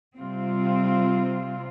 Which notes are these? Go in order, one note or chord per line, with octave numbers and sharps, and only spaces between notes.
C3 G3 C4 F4